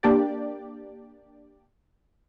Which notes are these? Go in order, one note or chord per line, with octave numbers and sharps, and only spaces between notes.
A#3 D4 G4 D5